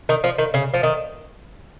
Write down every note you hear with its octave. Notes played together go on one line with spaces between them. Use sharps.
D#3
F3
D#3
C#3
F3
D#3